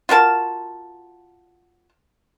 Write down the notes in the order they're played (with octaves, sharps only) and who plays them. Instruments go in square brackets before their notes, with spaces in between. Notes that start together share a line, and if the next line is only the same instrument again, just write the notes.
[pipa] F4 F#4 A#4 A5